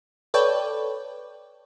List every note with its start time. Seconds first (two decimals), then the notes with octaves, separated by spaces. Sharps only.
0.34 A4 B4 C#5 D5 G5